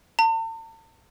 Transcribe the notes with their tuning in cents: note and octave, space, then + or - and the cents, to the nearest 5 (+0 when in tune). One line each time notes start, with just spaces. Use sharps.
A5 +40